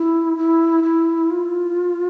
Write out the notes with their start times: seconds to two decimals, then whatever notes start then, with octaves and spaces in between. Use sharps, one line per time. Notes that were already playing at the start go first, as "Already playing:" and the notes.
Already playing: E4
0.37 E4
0.84 E4
1.31 F4